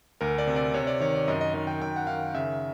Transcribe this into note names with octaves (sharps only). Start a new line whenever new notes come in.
D2 A#4
D5
C3
D5
C3 C#5
D5
D#3 C#5
D5
F#2 D#5
D#5
D#3 D#5
G5
F#2 G5
F#5
D#3 F5
C#3 E5